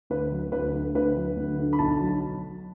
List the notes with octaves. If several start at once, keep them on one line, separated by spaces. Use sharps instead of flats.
D2 B4
F#3
D2 B4
D3
D2 B4
F#3
D2
D3
B5
B1 A5
F#3